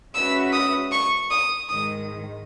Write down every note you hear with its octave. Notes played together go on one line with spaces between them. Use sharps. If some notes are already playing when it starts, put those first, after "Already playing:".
G#3 C#4 F#4 B4 E5 E6
D#6
C#6
D#6
G#2 D#3 G#3 D#6